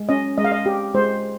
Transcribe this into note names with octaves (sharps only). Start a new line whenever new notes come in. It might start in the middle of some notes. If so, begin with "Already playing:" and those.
Already playing: G#3
C#4 D#5
G#3 D#5
F5
D#5
G4
G#3 C5